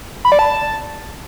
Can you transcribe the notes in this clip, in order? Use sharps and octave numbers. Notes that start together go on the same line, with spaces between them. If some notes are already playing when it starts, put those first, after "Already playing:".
B5
D5
A5